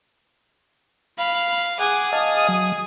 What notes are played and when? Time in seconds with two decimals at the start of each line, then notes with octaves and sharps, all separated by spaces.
1.18 F5 B5
1.80 G#4 F#5 D6
2.13 D#5 F5 A5 D#6
2.48 F#3